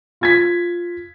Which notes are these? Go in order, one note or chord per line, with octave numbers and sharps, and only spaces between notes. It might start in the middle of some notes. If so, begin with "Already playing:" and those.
F4 G#6 B6